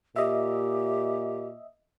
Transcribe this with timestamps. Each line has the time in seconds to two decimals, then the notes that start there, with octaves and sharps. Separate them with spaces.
0.16 A#2 G4 D#5 E5